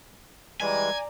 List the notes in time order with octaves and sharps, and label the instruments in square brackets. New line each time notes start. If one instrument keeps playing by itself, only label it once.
[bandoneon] E3 G3 G#3 [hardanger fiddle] D5 A#5 [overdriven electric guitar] G#5